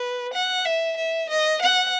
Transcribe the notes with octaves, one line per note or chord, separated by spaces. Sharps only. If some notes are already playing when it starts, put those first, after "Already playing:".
Already playing: B4
F#5
E5
E5
D#5
F#5